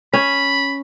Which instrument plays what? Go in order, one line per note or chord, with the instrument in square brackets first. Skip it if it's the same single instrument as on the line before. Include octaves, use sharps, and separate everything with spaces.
[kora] C#4 [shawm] B5